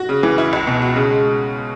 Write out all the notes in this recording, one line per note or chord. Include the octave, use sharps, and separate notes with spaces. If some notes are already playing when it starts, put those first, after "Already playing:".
Already playing: F#4
C#3
E3
E4
C#2
B2
F#4
C#3
G#3